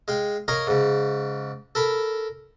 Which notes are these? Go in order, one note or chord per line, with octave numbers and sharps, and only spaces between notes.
G#3 F5 G5
A#4 C#5 D#5 F5 A#5
G#2 C#3
A4 A#4 B5